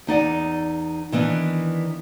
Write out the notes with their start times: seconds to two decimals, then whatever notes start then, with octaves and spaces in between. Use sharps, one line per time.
0.07 E2 D#4 D5 F#5
1.12 D#3 E3 B3 D4